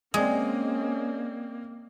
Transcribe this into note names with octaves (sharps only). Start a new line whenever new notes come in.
G#3 A#3 C4 C#4 D5 D#6